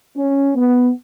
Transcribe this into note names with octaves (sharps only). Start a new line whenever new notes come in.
C#4
B3